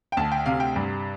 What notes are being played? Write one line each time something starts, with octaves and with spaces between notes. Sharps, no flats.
G5
D2 A5
G5
C3 F5
G5
G2